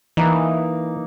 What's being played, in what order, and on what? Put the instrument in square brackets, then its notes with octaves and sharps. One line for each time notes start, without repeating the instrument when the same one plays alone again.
[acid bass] E3 [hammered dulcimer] A#3 D#4